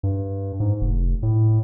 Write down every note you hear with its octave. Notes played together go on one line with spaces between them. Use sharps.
G2
G#2
F1
A2